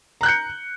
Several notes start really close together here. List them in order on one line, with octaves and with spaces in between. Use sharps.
A#5 F#6 G6 C#7